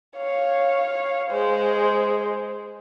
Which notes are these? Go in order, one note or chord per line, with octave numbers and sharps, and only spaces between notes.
C#5 F5
G#3 C5